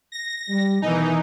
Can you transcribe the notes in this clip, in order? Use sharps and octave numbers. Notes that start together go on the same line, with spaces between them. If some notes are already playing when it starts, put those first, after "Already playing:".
A#6
G3
B1 D#3 E3 D#4 G#5